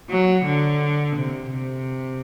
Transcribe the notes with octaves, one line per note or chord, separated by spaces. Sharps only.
F#3
D3
C3
C3